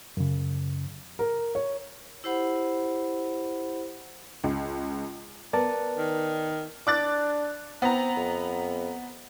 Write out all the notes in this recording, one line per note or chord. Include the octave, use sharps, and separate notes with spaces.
F#2 C#3
A#4
C#5
E4 G4 C5 F#5 B5
C#2
B3 A#4 D5 A5
D#3
D4 D6 F#6 A6
B3 C4 A#5
F2